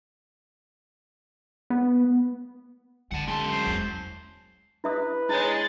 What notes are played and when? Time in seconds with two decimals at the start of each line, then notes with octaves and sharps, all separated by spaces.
1.70 B3
3.12 D3 F#5 A5
3.28 F#2 G#3 A5 C6
3.51 C5
3.67 E2
4.84 E4 B4 E5 D#6
5.29 G#3 E4 C#5 A6